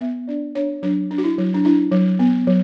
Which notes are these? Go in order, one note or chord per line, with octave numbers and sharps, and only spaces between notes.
B3 E5
D4 D5
D4 C#5
F#3 D4
D4
F#4
E4
F#3
D4
D4 E4
F#3
B3
F#3